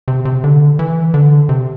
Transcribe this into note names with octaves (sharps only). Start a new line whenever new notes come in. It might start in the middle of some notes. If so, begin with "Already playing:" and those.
C3
C3
D3
E3
D3
C3